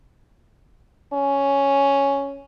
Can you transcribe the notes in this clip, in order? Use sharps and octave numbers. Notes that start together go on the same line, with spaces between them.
C#4